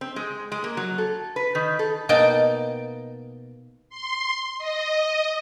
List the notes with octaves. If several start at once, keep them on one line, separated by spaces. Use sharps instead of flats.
C4
G#3
G#3
A#3
F#3
A4
B4
D#3
A4
B2 A#3 D#4 G5 A5
C6
D#5